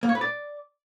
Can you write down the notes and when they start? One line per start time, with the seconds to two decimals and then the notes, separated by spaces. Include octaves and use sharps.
0.03 A#3
0.09 C#5
0.15 B4
0.21 D5